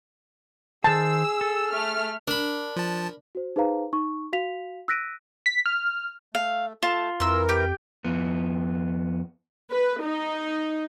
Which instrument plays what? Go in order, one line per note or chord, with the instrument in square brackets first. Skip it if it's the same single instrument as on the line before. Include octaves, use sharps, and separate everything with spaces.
[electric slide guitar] D#3 C5 [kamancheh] G#4 [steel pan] A5 [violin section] E6
[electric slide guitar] A4
[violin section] A3 F6
[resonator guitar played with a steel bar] D4 [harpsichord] A#4 B5
[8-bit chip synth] F3 A5
[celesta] F#4 C5
D#4 G#4 B4 C5 F5 A#5
D#4 C#6
F#4 F5 B6 F7
E6 F#6 A#6 B6 D7 D#7
[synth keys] B6
F6
[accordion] A3 [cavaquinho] F5
[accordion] A3 [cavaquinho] F4 [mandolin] A5
[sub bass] F2 [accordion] E3 A#4 [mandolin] C6 E6
[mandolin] G4 G5
[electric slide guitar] F2 B3
[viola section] B4
D#4